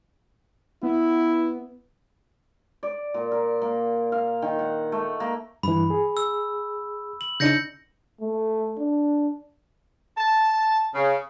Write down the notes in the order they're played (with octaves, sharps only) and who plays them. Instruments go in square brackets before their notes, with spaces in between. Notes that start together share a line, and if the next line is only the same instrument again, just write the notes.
[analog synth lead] B3 [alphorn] E4
[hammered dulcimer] D5
A#2
A#4
A#3
F5
D#3
F#5
A3
A#3
[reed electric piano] G2 E3 [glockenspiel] B5
[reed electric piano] G#4
[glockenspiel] E6
F#7
[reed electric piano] C#3 D4 D#4 [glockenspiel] G6 A#6 C#7
[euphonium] A3
D4
[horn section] A5
C#3